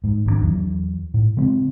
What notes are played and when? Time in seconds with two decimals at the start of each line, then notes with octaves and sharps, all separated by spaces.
0.04 G#2
0.26 G#1 C#3 D4
0.42 E2 E3 F#3
1.14 A2
1.37 C#3 G#3 C4